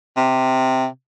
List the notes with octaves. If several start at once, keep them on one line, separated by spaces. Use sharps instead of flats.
C3